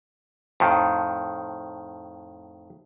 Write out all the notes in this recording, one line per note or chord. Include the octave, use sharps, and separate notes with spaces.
F2 A2 D#3